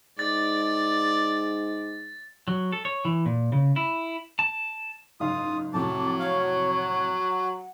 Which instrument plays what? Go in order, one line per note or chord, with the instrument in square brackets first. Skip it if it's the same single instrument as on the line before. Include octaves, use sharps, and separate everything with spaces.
[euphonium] G#2 [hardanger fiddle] D5 [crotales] A6
[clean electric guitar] F#3
A4
C#5
E3
A#2
C#3
E4
A5
[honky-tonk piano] F#1 G#2 F5 [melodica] F4 D#6
[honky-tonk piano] F2 A2 C3 [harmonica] F#3 [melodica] A5 [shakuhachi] D6
[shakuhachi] C#5 [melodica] F5
[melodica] F#4
[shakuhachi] F#5